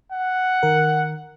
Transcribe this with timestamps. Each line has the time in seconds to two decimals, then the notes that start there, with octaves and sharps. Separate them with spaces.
0.12 F#5
0.63 D#3 A#4